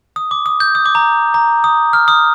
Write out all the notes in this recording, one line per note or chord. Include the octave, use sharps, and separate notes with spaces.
D#6
D6
D#6
G6
D#6
D6
A#5
A#5
D#6
F6
D#6